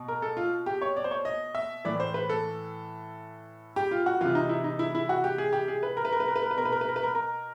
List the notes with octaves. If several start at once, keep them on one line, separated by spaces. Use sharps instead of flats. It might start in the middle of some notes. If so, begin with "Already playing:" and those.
Already playing: B2
A#4
A4
F4
G4
C#5
D5
C5
C#5
D#5
E5
A2 E3 D5
C5
B4
A4
G4
F4
F#4
C3 E3 F4
D#4
E4
D#4
E4
E4
F#4
G4
G#4
G4
G#4
B4
A#4
B4
A#4
B4
A#4
B4
A#4
B4
B2 A#4
B4
A#4
B4
A#4
B4
A#4
A#4